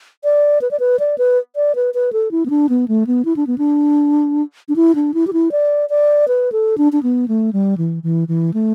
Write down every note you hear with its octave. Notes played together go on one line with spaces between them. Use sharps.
D5
B4
D5
B4
D5
B4
D5
B4
B4
A4
E4
B3
D4
B3
A3
B3
E4
D4
B3
D4
D4
E4
D4
E4
G4
E4
D5
D5
B4
A4
D4
D4
B3
A3
G3
E3
E3
E3
A3